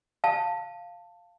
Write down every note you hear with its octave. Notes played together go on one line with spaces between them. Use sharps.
F5 A5